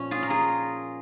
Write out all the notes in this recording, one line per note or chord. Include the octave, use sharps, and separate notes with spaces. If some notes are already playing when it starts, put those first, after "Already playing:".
Already playing: A#2 F3 C#4
F4 G#4
A#4
F4 G#4